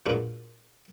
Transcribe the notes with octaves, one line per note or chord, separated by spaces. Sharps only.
A#2 G#3 B3 D4 F#4 A#4